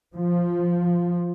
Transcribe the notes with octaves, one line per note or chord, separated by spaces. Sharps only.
F3